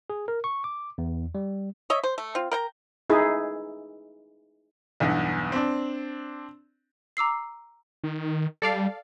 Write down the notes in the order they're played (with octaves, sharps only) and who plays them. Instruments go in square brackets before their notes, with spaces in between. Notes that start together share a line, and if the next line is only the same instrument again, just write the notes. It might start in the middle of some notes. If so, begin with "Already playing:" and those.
[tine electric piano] G#4
A#4
C#6
D6
E2
G3
[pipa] C#5 D#5 E5
C5
A3
C4 F4
A#4 G5 A#5
[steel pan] D#4 E4 G#4
[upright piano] B1 E2 G2 B3
C4 D4
[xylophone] A#5 D6 E6 C7
[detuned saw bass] D#3
[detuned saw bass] G3 [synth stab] A4 D5 F5